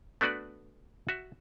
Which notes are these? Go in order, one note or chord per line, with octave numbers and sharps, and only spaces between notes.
A3 B3 D4 F#4 B4 D5
F#4 E5